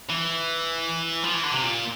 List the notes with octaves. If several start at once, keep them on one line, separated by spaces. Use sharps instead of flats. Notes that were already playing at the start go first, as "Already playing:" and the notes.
E3
F3
E3
D3
C3
A#2